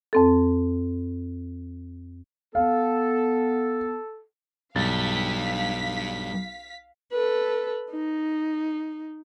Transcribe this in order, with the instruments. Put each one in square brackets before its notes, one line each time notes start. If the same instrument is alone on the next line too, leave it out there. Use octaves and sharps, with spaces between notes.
[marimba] F2 C4 A4
[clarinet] B3 [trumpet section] A4 [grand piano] F5
[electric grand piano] B1 A6 [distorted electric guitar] G2 [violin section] F5 B6
[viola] A4 B4
D#4